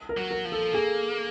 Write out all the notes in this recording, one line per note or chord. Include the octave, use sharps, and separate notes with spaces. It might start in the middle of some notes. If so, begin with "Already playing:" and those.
A#4
F#3
A#4
F3
A4
A#3 G#4